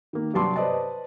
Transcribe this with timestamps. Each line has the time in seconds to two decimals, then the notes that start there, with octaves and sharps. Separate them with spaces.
0.13 D#3 A#3
0.34 G2 C3 F#3 A5 C6 D6
0.56 B4 C5 D5 D#5 A5